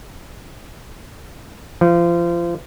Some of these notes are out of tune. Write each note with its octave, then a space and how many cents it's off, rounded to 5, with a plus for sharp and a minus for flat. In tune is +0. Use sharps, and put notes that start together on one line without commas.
F3 -30